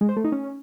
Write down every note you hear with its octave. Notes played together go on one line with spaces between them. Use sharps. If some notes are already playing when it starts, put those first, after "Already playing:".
G#3
C5
A3
D#4
C#4